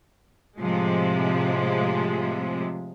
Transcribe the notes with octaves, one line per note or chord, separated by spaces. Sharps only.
A2 C3 F3 G#3